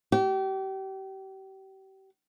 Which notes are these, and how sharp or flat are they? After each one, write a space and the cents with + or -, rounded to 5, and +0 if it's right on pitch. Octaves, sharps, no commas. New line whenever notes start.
G4 -35